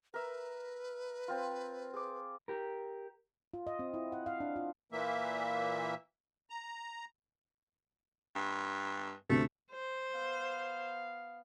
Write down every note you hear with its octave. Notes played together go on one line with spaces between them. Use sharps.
A#4 B4 E5
C4 F4
G#4 D6
G4 A#4
F4
D#5
C4
E4
F#5
F5
D4
F4
A#2 E3 A#3 E5
A#5
G2
D2 C3 A3
C5
B3 F5